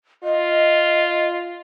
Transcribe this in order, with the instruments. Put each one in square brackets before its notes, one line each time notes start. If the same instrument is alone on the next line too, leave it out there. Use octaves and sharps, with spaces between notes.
[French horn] F4 [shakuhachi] D#5